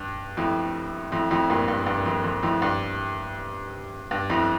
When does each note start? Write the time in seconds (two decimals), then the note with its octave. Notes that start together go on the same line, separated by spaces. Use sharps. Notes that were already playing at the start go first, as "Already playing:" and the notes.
Already playing: G2
0.37 F2 A2
1.12 F2 A2
1.31 F2 A2
1.50 G2 A#2
1.68 G2
1.86 G2
2.06 F2
2.24 F2
2.43 F2 A2
2.62 G2
4.11 G2
4.30 F2 A2